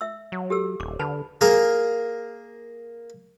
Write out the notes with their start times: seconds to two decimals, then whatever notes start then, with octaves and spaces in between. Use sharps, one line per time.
0.01 E5 E6
0.32 F#3
0.50 G4 A4 E6
0.80 D#1 D6
0.99 D3 B4 A5 B5
1.41 A#3 G#4 A#4